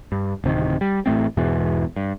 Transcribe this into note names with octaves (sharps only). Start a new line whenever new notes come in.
G2
D1 C3 D#3
G3
A1 A2 A3 C4
E2 G#2 B2 E3
G2